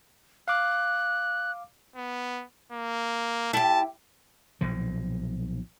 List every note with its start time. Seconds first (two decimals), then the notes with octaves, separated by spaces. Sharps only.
0.48 F5 D6 F#6
1.96 B3
2.72 A#3
3.53 E4 G4 A5
4.61 B1 A#2 F3